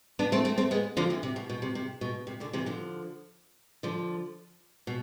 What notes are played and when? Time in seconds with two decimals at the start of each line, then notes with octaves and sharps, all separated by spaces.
0.19 B3 D4
0.32 A3 C4
0.45 A3 C4
0.58 A3 C4
0.71 G#3 B3
0.97 D3 F3
1.10 C3 E3
1.23 C3
1.36 B2
1.50 B2
1.62 C3
1.75 C3
2.01 B2
2.27 C3
2.40 B2 D3
2.53 C3 E3
2.66 D3 F3
3.83 D3 F3
4.87 B2